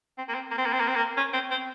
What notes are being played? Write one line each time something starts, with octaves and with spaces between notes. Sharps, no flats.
C4
A#3
C4
A#3
C4
A#3
C4
A#3
C4
A#3
C#4
C4
C4